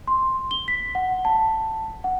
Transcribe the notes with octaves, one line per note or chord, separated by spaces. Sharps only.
C6
G7
B6
F#5
A5
F#5